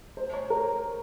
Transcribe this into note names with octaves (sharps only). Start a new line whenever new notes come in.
C5
C#5
A#4